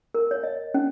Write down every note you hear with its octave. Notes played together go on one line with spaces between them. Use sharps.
A#4
C#5
D#5
C#4